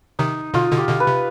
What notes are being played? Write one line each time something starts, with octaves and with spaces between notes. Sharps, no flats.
C3 D#3 D#4
B2 D3 F4
B2 D3
G4
B2 D3
B4
C3